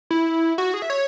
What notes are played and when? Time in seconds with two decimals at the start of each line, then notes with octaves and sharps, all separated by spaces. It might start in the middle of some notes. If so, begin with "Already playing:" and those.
0.11 E4
0.58 F#4
0.74 G#4
0.82 E5
0.90 C#5